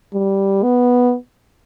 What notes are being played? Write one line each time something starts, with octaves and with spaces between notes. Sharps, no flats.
G3
B3